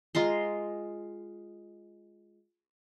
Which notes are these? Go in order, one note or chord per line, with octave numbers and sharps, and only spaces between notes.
G#3 F4 A#5 C6